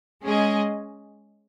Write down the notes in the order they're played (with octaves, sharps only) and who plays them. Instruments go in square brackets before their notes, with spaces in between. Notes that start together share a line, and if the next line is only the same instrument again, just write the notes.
[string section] G#3 C#4 G#4 D#5